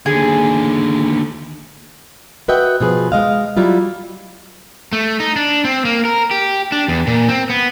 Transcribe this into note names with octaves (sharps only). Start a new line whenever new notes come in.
D#2 D3 G#4
F#4 B4 D#5 E5 F#5 G5
B2 F3 G#4 B4
G#3 D#5 F5
F#3 G3 E4 F4
A3
D#4
D4
C4
A#3
A#4
G4
D4
E2
A#2
C4
B3